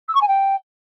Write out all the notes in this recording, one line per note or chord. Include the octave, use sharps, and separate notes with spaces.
E6
C#6
G#5
G5